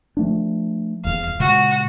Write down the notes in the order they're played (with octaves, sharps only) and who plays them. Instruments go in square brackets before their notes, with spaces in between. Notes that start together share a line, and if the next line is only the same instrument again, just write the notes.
[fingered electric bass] F3 A3 D4
[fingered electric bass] D#1 E2 [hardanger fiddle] F5
[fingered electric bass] A#2 C#3 G#3 [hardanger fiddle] F#4